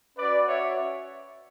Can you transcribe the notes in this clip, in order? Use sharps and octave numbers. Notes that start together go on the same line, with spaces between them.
C#4 F#4 B4 D5
C#5 E5